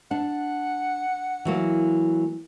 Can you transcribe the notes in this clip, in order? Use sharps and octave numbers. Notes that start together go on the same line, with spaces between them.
D4 F#5
E3 F#3 A#3